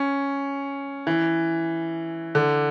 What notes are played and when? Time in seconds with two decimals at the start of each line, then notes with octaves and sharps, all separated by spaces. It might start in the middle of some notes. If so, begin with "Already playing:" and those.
Already playing: C#4
1.07 E3
2.35 D3